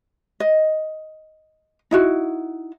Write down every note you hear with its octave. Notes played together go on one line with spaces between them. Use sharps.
D#5
D#4 E4 F#4